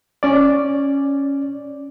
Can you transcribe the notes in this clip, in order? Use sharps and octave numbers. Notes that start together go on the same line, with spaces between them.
C#4 D5